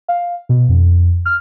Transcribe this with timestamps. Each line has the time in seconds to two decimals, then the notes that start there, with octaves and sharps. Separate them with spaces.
0.08 F5
0.49 B2
0.69 F2
1.26 F6